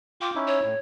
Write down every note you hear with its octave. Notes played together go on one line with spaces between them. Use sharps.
F4 G5 D6
C#4 D#4 E4
C#5
A2